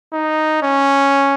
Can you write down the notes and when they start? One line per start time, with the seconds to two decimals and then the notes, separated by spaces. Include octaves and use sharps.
0.13 D#4
0.63 C#4